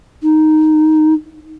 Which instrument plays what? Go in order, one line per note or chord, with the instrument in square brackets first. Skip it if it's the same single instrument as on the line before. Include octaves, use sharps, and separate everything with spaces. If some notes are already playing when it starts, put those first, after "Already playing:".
[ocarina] D#4